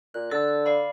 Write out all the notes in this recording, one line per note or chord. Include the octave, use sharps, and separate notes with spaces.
A#2 F#6
D3 A5 E6
D5 F5 B5